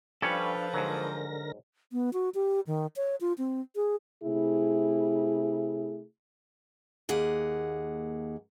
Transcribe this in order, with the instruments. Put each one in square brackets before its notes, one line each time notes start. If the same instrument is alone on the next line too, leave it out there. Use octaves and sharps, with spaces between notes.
[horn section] F3 [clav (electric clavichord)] G3 C#4 C#5 [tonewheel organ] D4 F5 [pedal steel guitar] A4 B4
[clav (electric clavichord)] G#2 F#3 [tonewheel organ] D3 A#4 A#6
[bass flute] B3
F#4
G4
D#3
C#5
F4
C4
G#4
[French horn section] C3 A3 E4 G#4
[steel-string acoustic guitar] D#2 A#3 G#4 F#5